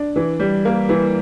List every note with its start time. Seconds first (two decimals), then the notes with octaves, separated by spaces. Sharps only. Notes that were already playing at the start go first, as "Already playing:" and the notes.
Already playing: D4
0.16 E3
0.40 G3
0.65 A#3
0.89 E3